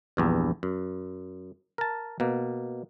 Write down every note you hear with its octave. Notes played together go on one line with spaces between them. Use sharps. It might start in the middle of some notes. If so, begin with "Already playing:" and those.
A#1 E2 G2
F#2
A#4 A5
B2 A#3